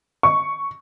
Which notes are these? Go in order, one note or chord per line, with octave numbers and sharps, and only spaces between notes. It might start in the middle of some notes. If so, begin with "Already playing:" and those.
C#6